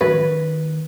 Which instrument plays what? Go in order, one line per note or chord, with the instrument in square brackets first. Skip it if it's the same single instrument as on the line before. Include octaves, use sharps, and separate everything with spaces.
[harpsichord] F#2 [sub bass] D#3 [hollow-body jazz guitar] B4